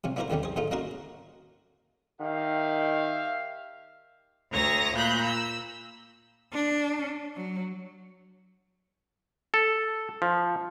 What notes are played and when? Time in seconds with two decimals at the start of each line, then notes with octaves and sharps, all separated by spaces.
0.04 C3 F3 C#4
0.16 B3 D4 E4 F4 A#4 C5
0.30 D#2 D3 D#3 G3 C#4
0.43 G#4 C5
0.56 G#2 D3 A3 D#4 F4
0.71 A#3 C#4 D#4 F#4 A#4 C6
2.21 D#3 G4 E5 F5
4.53 D2 C#5 A#5 D#6 A#6
4.95 A#2 A#5 B5 F#6 G6
5.24 E6
6.53 D4
7.36 F#3
9.54 A4
10.22 F3